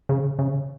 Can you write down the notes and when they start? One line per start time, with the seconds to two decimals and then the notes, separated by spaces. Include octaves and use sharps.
0.09 C#3
0.39 C#3